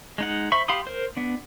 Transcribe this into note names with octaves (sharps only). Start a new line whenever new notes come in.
G#3 D#4 F#5
C5 E5 B5 C#6
G4 F5 B5 C6 D#6
A#4 C5
B3 D4